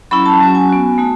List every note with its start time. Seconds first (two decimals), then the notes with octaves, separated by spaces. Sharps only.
0.11 F#3 C#4 E4 B5
0.26 A5
0.40 F#3 C#4 F#4
0.55 G#5
0.69 B3 F#4
0.98 A3 D#4 F#4